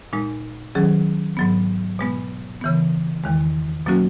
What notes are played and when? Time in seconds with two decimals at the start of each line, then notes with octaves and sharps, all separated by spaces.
0.13 A#2 G#3 D#4
0.75 D#3 F#3 C#4 G#4
1.37 G#2 F#3 B3
1.99 B2 G#3 B3
2.62 C#3 E3 B3
3.24 E2 D#3 G#3
3.86 B2 F#3 A#3 C#4 F#4